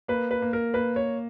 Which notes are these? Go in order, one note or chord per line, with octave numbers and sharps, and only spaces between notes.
A#3 B4
B4
A#3
A#4
A#3 B4
C#5